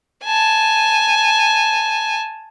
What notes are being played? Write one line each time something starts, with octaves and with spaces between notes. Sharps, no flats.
G#5 A5